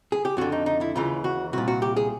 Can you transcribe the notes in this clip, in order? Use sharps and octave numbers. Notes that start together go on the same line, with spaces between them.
G#4
G4
F2 D3 F#4
D#4
D#4
E4
D#2 C#3 E3 F4
F#4
C2 A#2 F#4
F#4
G4
G#4